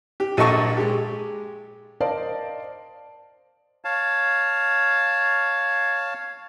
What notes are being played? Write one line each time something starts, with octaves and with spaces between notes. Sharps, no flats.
G4
A#1 A#2 A4 D#5 A5 C#6
G#3 G4
A#4 C5 D5 D#5 F5 A5
C#5 F5 A5